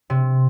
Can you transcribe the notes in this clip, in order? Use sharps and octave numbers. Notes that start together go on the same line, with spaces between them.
C3